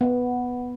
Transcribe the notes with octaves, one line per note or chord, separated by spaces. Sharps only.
B3